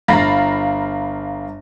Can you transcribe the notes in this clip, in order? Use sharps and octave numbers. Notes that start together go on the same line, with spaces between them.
G1 F5 A#5 B5 A6 A#6